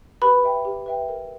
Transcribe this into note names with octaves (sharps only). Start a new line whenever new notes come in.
G4 B4 B5
B4 E5 G5
G4
B4 E5 G5
A#4